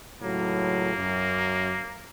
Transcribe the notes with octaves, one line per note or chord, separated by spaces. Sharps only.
C#2 A2 F#3 A#3
F#2